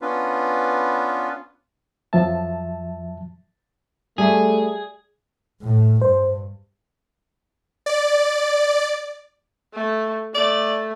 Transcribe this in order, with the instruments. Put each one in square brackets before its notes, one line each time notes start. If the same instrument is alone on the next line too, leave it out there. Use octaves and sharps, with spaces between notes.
[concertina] B3 C#4 D4 F4 B4
[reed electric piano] F2 F3 F#3 E5 A5
[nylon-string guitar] G3 [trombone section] A3 [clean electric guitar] G#4
[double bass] A2
[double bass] G2 [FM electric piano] C5
[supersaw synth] D5
[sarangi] A3
[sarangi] A3 [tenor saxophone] D5